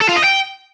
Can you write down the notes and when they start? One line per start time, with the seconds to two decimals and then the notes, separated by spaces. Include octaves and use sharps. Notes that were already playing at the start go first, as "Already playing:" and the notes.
0.01 A4
0.08 F4
0.16 D#5
0.24 G5